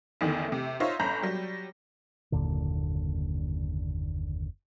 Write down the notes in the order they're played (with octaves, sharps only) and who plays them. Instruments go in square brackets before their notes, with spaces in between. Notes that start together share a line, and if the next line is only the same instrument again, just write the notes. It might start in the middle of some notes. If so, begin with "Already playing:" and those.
[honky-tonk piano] A1 E2 D3 D#3
C3 A3
D#4 F4 C5 C#5 E5
G1 C#4 A#5 B5 G6
F#3 G3
[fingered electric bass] F#1 D#2 A#2 D3